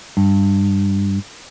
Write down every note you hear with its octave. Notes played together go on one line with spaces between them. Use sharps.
G2